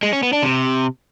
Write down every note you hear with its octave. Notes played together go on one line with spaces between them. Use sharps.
G#3
C#4
B3
D4
C3